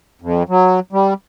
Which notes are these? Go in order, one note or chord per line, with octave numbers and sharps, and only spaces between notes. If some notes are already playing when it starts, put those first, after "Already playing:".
F2
F#3
G3